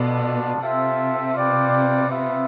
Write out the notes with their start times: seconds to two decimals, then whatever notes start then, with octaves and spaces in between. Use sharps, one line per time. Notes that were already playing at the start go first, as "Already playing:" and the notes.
Already playing: B2 B3 D4 F4 A4 D5
0.60 C3 C4 F4 A4 E5
1.34 F4 B4 D5 G5
2.08 B3 F4 B4 E5